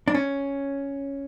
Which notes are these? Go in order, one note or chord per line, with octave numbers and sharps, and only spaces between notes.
D4
C#4